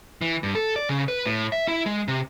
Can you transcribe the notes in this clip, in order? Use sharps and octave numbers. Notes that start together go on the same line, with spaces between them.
E3
G2
A4
D5
C#3
B4
A2
E5
E4
G#3
C3